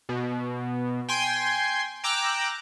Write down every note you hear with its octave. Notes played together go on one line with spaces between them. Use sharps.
B2
G5 G#5 C6
G5 A#5 D6 E6 F#6